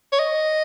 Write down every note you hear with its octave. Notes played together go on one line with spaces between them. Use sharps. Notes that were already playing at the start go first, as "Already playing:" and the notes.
C#5
D#5